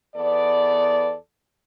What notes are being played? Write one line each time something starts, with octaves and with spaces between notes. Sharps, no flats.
E2 B3 A4 D5